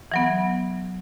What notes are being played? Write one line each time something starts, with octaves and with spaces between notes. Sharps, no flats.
E3 F#3 B3